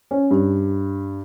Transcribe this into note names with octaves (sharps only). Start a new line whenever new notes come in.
C#4
G2